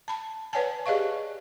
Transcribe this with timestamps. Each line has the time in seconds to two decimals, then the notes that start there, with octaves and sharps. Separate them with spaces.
0.08 A5 B5
0.53 B4 C#5 D5 F#5 G#5 A5
0.86 G4 G#4 D5 D#5 F5 C#6